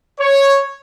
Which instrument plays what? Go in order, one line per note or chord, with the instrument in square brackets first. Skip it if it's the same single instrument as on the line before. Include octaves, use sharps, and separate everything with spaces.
[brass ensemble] C#5